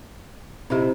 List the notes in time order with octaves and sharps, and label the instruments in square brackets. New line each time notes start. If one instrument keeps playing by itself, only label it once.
[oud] C3 D#4 E4 [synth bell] C4 G4